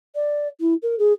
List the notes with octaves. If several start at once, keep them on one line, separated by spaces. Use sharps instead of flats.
D5
E4
A#4
G#4